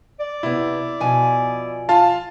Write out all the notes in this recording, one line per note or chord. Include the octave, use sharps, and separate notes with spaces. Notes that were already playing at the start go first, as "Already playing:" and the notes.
D5
C3 B3 E4
B2 F3 G#5
F4 F5 A5